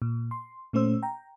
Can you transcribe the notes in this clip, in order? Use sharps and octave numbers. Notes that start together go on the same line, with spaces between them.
A#2
C6
A#2 A3 C#4 C5 E6
G5 A#5